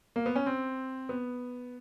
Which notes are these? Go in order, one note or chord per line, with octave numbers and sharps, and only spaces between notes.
A#3
B3
C#4
C4
B3